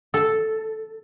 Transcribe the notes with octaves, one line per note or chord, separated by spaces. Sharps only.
A4